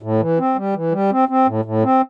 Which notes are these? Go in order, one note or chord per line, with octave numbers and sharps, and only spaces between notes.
A2
E3
C4
G3
E3
G3
C4
C4
A2
A2
C4